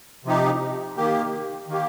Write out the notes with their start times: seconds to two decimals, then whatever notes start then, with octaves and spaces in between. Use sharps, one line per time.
0.25 C3 F3 D#4 G4
0.97 D#3 A#3 G4
1.68 D#3 A#3 G4